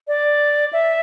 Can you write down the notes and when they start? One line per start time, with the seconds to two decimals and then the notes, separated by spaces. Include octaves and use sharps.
0.08 D5
0.73 E5